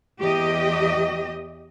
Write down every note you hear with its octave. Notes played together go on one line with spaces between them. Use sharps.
E2 G4 D#5